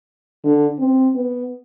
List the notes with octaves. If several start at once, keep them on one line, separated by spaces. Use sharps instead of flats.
D3
C4
B3